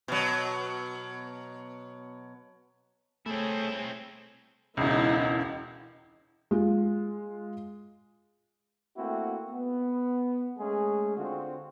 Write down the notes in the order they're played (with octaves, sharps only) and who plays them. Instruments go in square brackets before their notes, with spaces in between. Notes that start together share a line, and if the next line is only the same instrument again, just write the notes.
[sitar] B2 F#3
[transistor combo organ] A3 [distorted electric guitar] C4 E4 [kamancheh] G#4 C#5
[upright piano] E1 C#2 [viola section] D#4 E4
[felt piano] G#3 F4
[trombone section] A3 A#3 C4 E4 F#4
B3
G#3 A3 C#4 G#4
D3 C4 F4 F#4